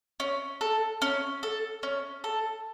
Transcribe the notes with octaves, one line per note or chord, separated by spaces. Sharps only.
C#4
A4
C#4
A4
C#4
A4